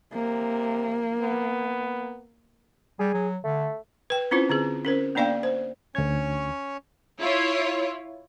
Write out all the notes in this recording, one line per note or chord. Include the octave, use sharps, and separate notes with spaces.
C3 A#3
B3
G3 G#4
F#3
D3 A3
B4 G5
C4 C#4 E4 F4 C5
D3 C4 G#4
C#4 A#4 C5
A#3 B3 D4 D5 F5 G5
C5
D2 C#4 C#5 G#6
E4 F4 C#5